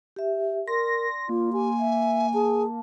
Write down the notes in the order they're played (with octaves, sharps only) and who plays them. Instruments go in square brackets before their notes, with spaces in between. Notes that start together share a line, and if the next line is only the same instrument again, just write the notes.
[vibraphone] G4 E5
[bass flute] A#4 [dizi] D5 [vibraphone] C6 [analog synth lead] A#6
[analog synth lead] A#3 [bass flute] F4
[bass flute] G4 [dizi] G#5
[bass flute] E5
[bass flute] G#4 [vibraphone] A5